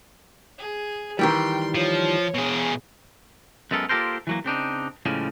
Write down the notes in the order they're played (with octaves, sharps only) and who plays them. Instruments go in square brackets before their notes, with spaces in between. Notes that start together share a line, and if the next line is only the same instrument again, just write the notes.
[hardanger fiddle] G#4
[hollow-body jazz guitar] D#3 E3 G3 [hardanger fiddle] G5 C6
[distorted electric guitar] F3 [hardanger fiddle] C#5
[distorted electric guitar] B2 G#4
[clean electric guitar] F#2 G#3 B3 A4 A#4
A#3 F4 G4 A4 A#4 C5
E3 F#3 A#3
C#3 C4 D4 D#4
A2 C#3 F3 G3 G#3